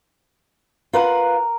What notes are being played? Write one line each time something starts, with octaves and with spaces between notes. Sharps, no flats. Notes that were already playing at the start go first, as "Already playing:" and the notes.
F4 A#4 B4 F#5